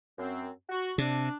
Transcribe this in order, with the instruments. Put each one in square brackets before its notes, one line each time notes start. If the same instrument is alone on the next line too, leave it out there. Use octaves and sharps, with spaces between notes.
[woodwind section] F#2 C4
F#4
[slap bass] C3 [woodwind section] D4